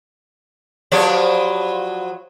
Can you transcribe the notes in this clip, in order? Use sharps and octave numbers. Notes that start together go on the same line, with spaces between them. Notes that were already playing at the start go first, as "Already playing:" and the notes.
F3 F#3 G4 B4 C#5 D5